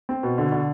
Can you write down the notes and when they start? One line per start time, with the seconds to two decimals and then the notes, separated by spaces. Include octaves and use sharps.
0.09 C4
0.23 B2
0.38 D3
0.52 D3